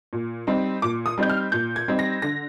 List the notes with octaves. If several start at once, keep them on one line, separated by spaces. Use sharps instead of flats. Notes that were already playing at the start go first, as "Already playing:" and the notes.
A#2
G3 C4 D#4
A#2 D6
D#6
G3 C4 D#4 G6
F6
A#2 G6
G#6
G3 C4 D#4
A#6
D3 A#6